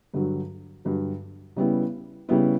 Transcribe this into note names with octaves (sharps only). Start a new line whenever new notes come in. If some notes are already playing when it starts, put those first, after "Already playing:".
G2 D3 F#3
G2 D3 F#3
C#3 G3 B3 E4
C#3 G3 B3 E4